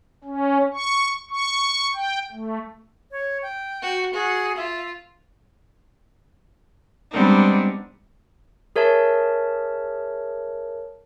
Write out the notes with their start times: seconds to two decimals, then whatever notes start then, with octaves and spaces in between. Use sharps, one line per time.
0.24 C#4
0.74 C#6
1.30 C#6
1.95 G5
2.32 A3
3.11 C#5
3.42 G5
3.82 F#4
4.14 F#4 G#4
4.57 F4 E5
7.11 G3 G#3 B3 C4 D4 D#4
8.76 G#4 A#4 C#5 E5 A5